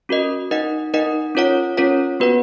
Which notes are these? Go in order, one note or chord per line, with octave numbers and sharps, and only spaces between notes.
C#4 F#4 A#4 D#5
D#4 A#4 D#5 F#5
D#4 A#4 D#5 F#5
C#4 F4 A#4 C#5 F#5
C#4 F4 A#4 C#5 F#5
B3 F#4 B4 F#5